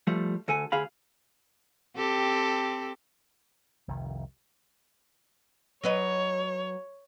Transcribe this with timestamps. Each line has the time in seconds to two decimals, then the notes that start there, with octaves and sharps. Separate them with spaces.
0.07 F3 G3 A3
0.48 D2 A4 G#5
0.72 D2 G#4 F5 B5
1.96 C4 G4 A4
3.88 F1 C2 C3 D#3
5.84 F#3 B4 C#5 D#5